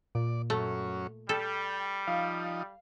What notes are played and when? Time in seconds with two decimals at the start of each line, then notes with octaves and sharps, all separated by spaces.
0.15 A#2 D5
0.50 F#2 A3 C#4
1.29 G3 A4 G5
2.07 F3 D#4 F5